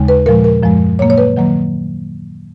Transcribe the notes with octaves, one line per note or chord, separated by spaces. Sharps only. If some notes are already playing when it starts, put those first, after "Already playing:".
Already playing: D#2 C#3 G#3
B4
A#2 F3 G#3 A#4
A#4
F#2 F3 G#3
A#2 F#3 A#3 C#5
C#5
B4
D#3 F#3 A#3